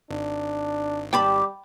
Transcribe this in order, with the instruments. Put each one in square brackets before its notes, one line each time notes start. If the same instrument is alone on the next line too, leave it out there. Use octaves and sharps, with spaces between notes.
[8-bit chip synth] G#1 [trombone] D4
[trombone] G3 [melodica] G4 [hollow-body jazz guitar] G5 A5 B5